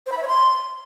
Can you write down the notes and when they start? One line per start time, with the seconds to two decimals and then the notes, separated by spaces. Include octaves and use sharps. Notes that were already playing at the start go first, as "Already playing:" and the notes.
0.06 C5
0.12 B5
0.17 E5
0.22 C#5
0.28 C6